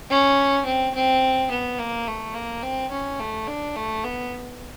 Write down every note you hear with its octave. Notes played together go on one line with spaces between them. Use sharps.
C#4
C4
C4
B3
A#3
A3
A#3
C4
C#4
A3
D4
A3
B3